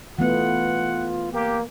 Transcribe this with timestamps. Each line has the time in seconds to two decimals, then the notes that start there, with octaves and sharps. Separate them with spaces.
0.19 E3 A3 B3 F4 F#5
1.33 A#3 G4